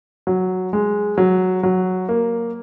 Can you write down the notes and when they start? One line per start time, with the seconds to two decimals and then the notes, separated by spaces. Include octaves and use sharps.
0.27 F#3
0.73 G#3
1.18 F#3
1.63 F#3
2.09 A#3